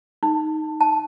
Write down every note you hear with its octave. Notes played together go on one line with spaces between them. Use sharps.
D#4
A5